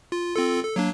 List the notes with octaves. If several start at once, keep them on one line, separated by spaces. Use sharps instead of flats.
F4
C4 F4 A4
A4
F#3 A#3 D4